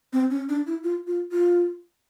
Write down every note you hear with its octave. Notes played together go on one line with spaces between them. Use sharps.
C4
C#4
D4
E4
F4
F4
F4